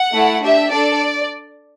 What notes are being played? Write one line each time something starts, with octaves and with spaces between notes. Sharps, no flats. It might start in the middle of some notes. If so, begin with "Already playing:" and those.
Already playing: F#5
A3 E4 A4
D4 G4 E5
D4 A4 D5